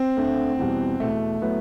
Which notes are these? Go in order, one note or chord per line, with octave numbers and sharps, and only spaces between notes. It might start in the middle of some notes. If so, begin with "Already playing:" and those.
Already playing: C4
D2 D3 A3
E2 B2 G3
E2 B2 A3
A2 F#3 A3 B3